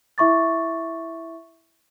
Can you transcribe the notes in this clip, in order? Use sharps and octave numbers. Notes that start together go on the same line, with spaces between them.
E4 E5 C#6 D6 A6